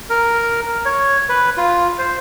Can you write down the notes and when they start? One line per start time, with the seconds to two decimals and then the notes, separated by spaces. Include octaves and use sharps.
0.10 A#4
0.85 C#5
1.29 B4
1.57 F4
1.98 C5